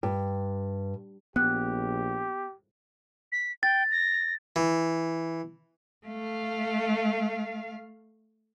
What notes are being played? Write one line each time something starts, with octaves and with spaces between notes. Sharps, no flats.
G2
A#1 B3 G4 F#6
B6
G5 A6
A#6
E3
A3 F5